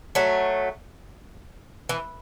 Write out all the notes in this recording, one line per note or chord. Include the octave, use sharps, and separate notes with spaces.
F#3 A3
E3